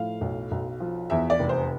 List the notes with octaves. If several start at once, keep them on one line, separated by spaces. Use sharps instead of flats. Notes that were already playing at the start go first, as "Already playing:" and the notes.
Already playing: A2 F3 F5
B1
B1
F3
E2 E5
D5
F1
C5